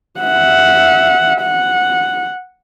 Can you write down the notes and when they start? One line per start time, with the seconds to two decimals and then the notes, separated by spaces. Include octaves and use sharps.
0.20 E5 F#5
1.41 F#5